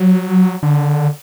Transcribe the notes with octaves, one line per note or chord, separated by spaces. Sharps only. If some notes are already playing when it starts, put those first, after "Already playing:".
Already playing: F#3
D3